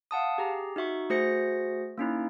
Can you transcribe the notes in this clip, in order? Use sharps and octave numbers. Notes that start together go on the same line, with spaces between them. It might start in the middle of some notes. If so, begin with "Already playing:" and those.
F5 F#5 A5 D#6
G4 G#4 A#5
D#4 F#4 E5 C#6
A3 F#4 G#4 C5 A#6 C#7
A#3 C#4 D#4 E4